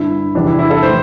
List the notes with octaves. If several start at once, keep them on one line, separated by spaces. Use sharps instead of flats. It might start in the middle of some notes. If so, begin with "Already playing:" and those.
Already playing: G2 D3 E4
E2 C3 E3 D4
E4
E4
A4
A2 E3 C5